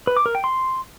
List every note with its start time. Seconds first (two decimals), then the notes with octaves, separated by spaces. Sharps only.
0.07 B4
0.17 D6
0.26 A#4
0.35 G5
0.44 C6